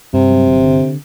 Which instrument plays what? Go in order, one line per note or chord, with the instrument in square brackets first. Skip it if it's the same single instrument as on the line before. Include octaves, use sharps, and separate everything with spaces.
[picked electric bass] G2 [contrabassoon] C3
[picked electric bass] F#3
G1
D3